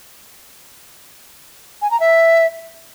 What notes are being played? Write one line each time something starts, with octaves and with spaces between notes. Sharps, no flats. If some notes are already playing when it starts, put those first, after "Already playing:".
G#5
A#5
E5